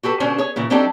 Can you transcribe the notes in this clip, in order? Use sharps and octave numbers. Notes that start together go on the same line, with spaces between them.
F#4 G4 A4 B4
B2 D3 C#4 D4 C5
G#4 C#5
A#2 C#3 E3
F#3 C4 D4 D#4 G4 A4